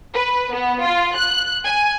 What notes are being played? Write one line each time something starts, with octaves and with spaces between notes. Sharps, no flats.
B4
B3
F4
F#6
G#5